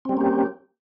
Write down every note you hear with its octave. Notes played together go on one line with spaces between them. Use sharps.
G3 A#3 C4 C#4 G4